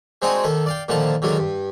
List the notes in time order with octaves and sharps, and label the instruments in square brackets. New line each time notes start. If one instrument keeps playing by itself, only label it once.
[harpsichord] G#3 C4 D4 D#4 F#4 G#4
D#2 D#3 A4
D5 F5 G5
A#2 D3 D#3 F3 A5
D3 D#3 F#3 G#3 D4
G2